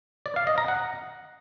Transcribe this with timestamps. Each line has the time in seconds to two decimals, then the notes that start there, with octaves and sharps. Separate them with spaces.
0.26 D5
0.36 F5
0.47 D#5
0.58 A#5
0.68 F#5